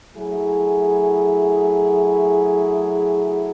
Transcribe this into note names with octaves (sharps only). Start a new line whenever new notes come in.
F#3 A3 E4 G#4